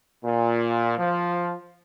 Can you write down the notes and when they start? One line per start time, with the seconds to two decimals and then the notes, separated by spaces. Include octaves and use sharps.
0.24 A#2
0.98 F3